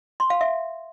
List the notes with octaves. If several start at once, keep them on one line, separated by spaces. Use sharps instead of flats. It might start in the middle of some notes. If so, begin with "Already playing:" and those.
C6
F5
E5